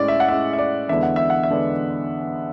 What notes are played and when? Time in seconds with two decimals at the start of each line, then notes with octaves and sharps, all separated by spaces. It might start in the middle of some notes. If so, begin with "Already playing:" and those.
Already playing: A2 G#3 C#4 D5
0.08 E5
0.20 F#5
0.28 A2 G#3 C#4 E5
0.53 E5
0.58 D5
0.89 E2 D3 G#3 B3 D4 E5
1.03 F#5
1.16 E5
1.30 F#5
1.43 E5
1.50 D3 G#3 B3 D4